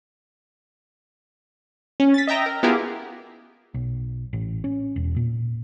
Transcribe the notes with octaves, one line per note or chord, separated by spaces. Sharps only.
C#4
A6 B6
D#5 E5 G5 A#5 A#6
A#4
B3 E4 F4 G4 G#4 A#4
B1
A1
C#4
E1
A#2